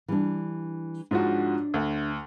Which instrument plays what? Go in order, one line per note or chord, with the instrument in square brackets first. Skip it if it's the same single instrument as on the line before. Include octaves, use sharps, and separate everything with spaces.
[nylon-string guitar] E3 G3 D4
[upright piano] G#2 F3 F#4 [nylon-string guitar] D4 C#5 D#5
[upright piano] D2